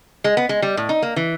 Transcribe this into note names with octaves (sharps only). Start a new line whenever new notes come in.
G#3
B3
G#3
G3
A2
D#4
A#3
E3